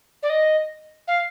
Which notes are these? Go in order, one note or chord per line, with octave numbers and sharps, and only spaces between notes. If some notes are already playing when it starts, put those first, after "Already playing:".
D5
D#5
F5